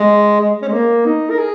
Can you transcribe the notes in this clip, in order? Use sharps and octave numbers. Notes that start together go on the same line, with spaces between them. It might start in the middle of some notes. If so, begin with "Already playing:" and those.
Already playing: G#3
G#3
C#4
G#3
A#3
D#4
A#4
G#4